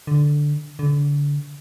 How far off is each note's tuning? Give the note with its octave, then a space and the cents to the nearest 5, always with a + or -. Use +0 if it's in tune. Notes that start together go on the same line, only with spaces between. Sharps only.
D3 +0
D3 -30